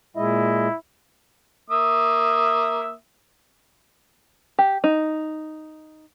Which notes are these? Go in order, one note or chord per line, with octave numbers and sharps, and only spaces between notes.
A#2 G#3 E4 D#5
A#3 E5 D#6
G4
D#4